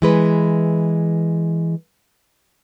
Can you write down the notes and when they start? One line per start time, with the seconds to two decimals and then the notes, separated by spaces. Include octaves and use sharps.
0.02 E3 G#3 B4